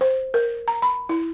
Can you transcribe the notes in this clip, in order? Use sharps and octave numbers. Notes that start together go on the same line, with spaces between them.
C5
A#4
A#5
B5
E4